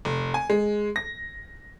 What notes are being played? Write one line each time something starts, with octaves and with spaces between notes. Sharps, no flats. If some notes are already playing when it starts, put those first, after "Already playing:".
F1
G#5
G#3
A#6